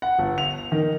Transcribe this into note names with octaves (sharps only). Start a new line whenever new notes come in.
F#5
G1
F7
D#3